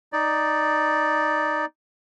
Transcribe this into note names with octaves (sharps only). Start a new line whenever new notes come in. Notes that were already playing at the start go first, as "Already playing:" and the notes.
D#4 D5